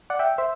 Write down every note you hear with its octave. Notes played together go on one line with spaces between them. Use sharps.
D5 F#5
E5 G5
C5 E5